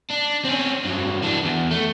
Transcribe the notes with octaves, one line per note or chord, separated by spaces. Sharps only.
D4
C4 C#4
G2 F#3
E3 D4
E2
A3